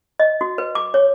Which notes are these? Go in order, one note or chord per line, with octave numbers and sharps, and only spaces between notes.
D#5
F#4
B4
D6
C#5